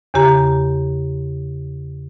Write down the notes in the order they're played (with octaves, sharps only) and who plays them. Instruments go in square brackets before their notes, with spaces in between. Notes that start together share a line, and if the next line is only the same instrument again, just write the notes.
[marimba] E2 C#3 G4 A#5